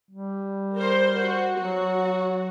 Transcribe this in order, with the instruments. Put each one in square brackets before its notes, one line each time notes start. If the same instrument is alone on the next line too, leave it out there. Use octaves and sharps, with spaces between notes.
[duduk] G3
[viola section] A#4 C5
F#4
[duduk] F#3 [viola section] F#4